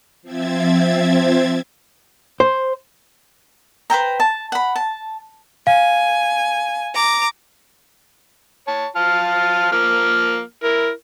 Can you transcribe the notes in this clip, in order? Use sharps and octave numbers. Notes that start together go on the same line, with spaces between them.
F3 C4 E5 G#6 A6
C5
B4 C5 G5 A#5
A5
F#5 B5
A5
F5 G#5
A#5 D6
C#5 A5
F4 F5 A5
F3 A#3 F6
E4 A#4